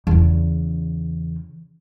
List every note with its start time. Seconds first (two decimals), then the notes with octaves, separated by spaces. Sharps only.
0.07 E2 C#3